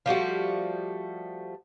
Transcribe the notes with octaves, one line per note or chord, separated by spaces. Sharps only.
F3 G3 A3 F#4